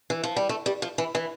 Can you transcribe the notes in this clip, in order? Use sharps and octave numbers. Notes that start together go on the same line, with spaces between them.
E3
F3
G3
A3
G3
F3
E3
E3